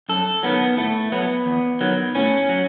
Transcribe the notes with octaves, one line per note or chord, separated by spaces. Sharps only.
F#2 A4
D#3 F#3 B3
A2 A3
F#3 B3
E2
D#3 F#3
A2 C#4
F#3